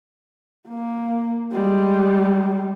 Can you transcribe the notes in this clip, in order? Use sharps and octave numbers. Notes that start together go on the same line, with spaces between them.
A#3
G3 G#3